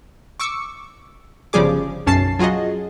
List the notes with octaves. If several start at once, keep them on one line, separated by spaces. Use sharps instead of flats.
C#6 D6 E6 C#7
G1 C#3 F3 G3 G#4 D6
B1 F#2 C#4 A5 A6 C7
F#3 F4 F#4 G#4 D#5